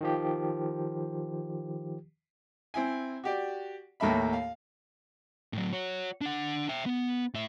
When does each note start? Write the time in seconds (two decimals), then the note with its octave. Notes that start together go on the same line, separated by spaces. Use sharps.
0.01 D#3 F3 G4
2.74 C4 E4 G#5
3.24 F#4 G4 D5
4.00 D#2 A2 A#3 A4 E5 B5
4.33 F5
5.53 A2 F#3
5.72 F#4 C#5
6.21 D4 F#5
6.69 E5 G5
6.86 B3
7.34 A2 E5